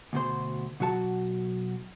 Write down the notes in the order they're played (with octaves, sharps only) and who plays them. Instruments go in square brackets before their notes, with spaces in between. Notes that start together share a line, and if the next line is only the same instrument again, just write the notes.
[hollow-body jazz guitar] D2 B2 C5
B2 F#3 F#4 A5